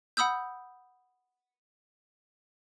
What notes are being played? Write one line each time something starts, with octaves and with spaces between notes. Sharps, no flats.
F#5 B5 D#6 E6 G6